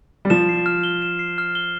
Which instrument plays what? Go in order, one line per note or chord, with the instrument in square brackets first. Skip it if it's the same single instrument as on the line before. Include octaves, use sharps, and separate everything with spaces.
[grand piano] G3
[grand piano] F3 [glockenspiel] E7
[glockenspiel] C7
F6
G7
E7
C7
F6
G7